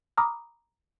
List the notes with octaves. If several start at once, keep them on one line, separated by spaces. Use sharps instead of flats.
A#5 B5 D6 D#6 F6